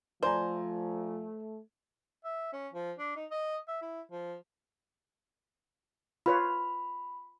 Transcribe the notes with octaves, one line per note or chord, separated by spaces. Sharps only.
F3 A3 C5 D5 G#5 A#5
E5
C#4
F3
D4
D#4
D#5
E5
E4
F3
F4 B4 C#5 B5